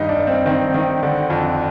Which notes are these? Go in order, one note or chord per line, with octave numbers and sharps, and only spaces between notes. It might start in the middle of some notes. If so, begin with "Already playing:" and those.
Already playing: G2 D#3 D#4
D4
G2
C4
D#3 C4
D#3
D3
F2